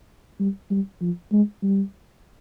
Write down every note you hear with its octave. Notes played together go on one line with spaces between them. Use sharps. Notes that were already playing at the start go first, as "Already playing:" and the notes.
G3
G3
F3
G#3
G3